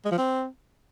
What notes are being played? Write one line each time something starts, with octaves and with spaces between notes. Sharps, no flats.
G#3
F3
C4